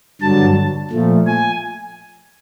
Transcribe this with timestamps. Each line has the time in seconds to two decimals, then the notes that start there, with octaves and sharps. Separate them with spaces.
0.21 G2 D3 F#3 A5
0.91 A#2 F3 A3
1.26 G#5